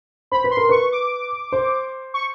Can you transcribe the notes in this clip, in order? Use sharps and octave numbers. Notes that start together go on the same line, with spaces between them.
C5 B5
B4
C6
A#4
B4 C#6
D6
C5
C#6